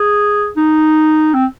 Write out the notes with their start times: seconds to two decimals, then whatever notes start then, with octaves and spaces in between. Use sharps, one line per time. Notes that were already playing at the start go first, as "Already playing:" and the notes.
Already playing: G#4
0.56 D#4
1.33 C4